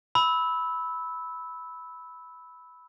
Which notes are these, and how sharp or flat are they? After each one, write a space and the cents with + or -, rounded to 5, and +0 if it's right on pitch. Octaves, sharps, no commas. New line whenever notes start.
B5 +0 E6 -15